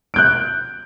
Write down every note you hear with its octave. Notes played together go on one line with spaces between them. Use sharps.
F#6 G6 D7